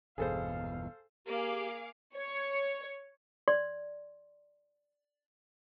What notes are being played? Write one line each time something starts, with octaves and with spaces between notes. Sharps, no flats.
G1 E2 B2 G#4 A4 C5 F5
A#3 G4 G#4 F5 D6
C#5
D5 C6